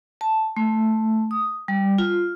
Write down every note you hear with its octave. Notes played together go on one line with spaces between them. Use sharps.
A5
A3
D#6
G3
F4